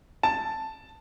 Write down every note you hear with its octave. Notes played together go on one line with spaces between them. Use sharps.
A5